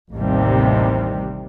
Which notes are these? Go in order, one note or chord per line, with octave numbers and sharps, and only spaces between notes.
A1 D#2 C3 G3